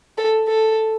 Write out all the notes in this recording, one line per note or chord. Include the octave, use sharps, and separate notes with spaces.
A4
A4